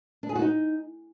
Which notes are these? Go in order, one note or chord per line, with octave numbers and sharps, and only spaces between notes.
D4
G#4
F#4
D#4